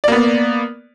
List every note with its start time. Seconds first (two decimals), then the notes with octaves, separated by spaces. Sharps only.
0.04 D5
0.08 A#3
0.12 B3